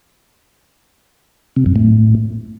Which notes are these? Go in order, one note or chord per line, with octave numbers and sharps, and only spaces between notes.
C3
F#2
A2